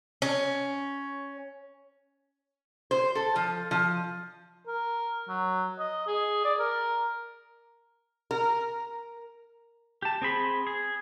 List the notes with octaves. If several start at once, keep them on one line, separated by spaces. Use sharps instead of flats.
C#4
C5
A4
F3
F3
A#4
F#3
D#5
G#4
D5
A#4
A#4
G4 A5
C4 G#4 B5 C6
G#4